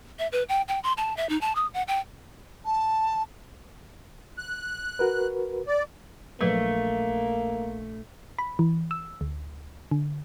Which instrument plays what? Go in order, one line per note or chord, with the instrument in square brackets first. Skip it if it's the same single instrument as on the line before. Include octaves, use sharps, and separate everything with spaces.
[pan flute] E5
B4
G5
G5
C6
A5
E5
D#4
A5
D#6
F#5
G5
[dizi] A5
[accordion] F#6
[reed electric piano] F#4 A#4 B4
[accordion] D5
[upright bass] A#1 [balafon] F3 F#3 B4 [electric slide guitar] A3 [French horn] A#3
[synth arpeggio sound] B5
E3
E6
D2
D3